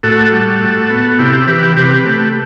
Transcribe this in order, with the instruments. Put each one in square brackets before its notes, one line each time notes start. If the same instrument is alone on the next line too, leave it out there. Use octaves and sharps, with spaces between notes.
[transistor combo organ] A2 F#4 A4
G3
A2
B3
C3 E4 G4
E3 G4 B4
C3 G4 B4
A3